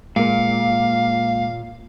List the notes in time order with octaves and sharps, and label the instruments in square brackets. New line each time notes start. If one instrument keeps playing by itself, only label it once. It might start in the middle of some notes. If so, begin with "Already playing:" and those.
[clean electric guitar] A#2 [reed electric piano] G#3 A#3 [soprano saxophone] F5